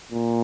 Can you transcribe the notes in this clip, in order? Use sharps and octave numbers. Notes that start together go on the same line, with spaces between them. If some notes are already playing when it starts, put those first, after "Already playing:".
A#2